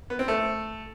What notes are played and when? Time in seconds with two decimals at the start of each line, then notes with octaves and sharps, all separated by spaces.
0.10 B3
0.19 C4
0.28 A3